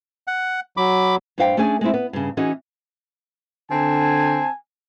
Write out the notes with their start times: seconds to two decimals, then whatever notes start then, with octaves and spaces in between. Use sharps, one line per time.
0.27 F#5
0.77 F#3 B5 D6
1.38 G2 D4 E4 C5 F5 G5
1.57 A3 C#4 D4 G#4 C#5 G#5
1.81 G#3 A3 C4 E4
1.94 B3
2.13 G2 C#3
2.37 E3 C#4 D#4 F#4 G#4 D#5
3.71 D3 C4 G#5 A5